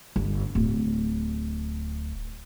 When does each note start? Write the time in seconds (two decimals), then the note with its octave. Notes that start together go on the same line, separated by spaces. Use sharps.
0.16 G1
0.55 D1